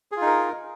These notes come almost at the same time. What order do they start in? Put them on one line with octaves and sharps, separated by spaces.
G#4 F4 D#4 A#4